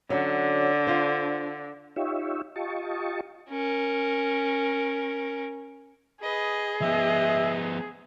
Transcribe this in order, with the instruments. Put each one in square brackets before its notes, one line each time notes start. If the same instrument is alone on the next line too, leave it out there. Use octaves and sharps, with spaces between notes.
[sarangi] D3 [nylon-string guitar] F#3 C#4
[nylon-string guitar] D4 F4 C5
[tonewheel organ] D#4 F4 G4 C#5 E5
F4 G4 D#5 A5 C#6
[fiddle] C#4 A#4
[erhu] G#4 [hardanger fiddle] B4 D#5
[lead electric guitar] F3 B3 [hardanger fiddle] D#5 [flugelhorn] E5